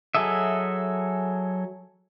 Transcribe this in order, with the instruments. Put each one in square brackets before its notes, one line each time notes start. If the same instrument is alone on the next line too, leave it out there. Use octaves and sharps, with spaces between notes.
[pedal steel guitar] F#3 G#4 A4 D#5 E5